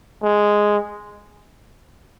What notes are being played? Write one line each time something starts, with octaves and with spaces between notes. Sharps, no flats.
G#3